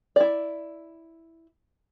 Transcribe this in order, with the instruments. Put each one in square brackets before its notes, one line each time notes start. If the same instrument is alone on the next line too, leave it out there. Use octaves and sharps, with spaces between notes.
[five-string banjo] E4 D5